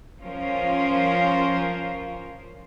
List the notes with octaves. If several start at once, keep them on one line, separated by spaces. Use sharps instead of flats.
F3 C#4 F4 A#4 C5